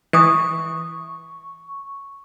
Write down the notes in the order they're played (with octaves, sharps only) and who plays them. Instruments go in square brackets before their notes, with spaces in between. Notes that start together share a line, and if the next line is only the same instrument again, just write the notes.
[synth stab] E3 [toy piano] E5 D#6 [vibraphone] C#6